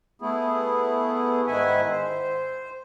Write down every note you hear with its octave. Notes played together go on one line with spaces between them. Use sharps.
A3 B3 E4 G#4
G#2 D#3 E4 E5 F#5 G#5
C5